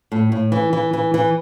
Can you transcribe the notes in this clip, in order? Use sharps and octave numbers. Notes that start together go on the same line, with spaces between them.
A2
A2
E3
E3
E3
E3